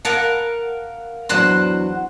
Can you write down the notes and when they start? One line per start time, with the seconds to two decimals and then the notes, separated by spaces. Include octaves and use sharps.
0.05 A#4 F5 F#5 A5
1.29 E2 F#3 D4 C5 F#5 F#6